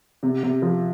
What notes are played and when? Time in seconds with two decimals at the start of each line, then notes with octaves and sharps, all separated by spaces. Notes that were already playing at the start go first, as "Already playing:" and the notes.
0.23 C3
0.43 C3
0.62 F3